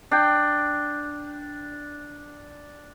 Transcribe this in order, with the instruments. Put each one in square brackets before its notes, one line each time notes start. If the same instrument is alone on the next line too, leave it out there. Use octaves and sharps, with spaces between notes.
[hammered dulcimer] D4 G5